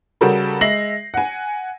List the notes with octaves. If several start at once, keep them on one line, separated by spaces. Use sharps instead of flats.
C#3 G3 F#4 G4 A4 A#4
G#3 E5 A#6 C7 F#7
F#5 G#5